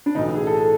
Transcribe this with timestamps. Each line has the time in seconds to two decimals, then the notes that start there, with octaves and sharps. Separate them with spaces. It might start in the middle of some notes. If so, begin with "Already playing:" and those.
0.06 D4
0.15 B1 A2 E3 D#4
0.36 G#4
0.47 A4